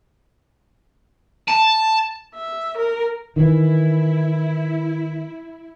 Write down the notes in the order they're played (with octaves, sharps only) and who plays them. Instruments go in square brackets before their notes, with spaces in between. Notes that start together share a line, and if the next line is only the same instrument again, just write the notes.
[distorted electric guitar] A5
[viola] E5
A#4
[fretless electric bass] D#3 E3 [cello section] E4